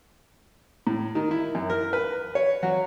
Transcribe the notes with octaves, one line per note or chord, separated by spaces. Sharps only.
A2
D#3
E4
F#2
A#4
B4
C#5
F#3